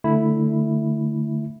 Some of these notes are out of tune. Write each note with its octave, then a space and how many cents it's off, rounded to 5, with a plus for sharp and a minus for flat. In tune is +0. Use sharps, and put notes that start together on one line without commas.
D3 +0 A3 +0 E4 +0